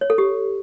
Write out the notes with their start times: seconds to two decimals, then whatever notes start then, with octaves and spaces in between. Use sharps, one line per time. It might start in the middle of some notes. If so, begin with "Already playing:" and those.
0.01 C#5
0.10 A4
0.18 G4